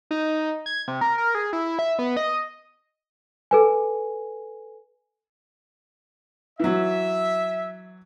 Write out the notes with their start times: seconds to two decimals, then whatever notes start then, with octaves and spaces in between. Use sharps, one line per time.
0.11 D#4
0.66 G#6
0.88 C3
1.01 A#4
1.18 A#4
1.35 G#4
1.53 E4
1.79 E5
1.99 B3
2.17 D#5
3.51 A4 B4 G#5
6.60 E3 F#3 E5